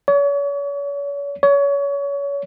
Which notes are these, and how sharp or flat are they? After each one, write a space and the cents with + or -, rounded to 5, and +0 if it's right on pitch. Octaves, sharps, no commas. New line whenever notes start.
C#5 +40
C#5 +30